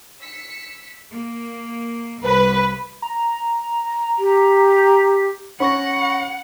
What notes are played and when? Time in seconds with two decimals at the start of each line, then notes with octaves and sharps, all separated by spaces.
0.21 E6 B6 C#7
1.13 A#3
2.24 C2 B4
3.02 A#5
4.19 G4
5.60 C#4 F#5 B5 C#6 A#6